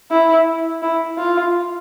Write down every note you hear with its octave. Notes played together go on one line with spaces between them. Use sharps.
E4
E4
F4